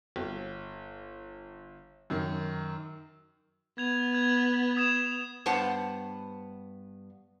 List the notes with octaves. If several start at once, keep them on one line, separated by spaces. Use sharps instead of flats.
G1
F#2 D#3
B3 G#6 F7
G#6
D#6 G#6 E7
G2 B3 C5 F#5 A5